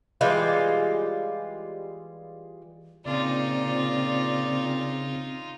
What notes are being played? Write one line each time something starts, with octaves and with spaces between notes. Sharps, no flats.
E3 G3 G#3 F4
A#2 C#3 C4 D#4 F4 D5